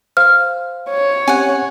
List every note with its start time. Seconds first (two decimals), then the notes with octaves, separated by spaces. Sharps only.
0.17 C5 F5 F6
0.90 C#5
1.28 C4 C#4 G4 F#5 G#5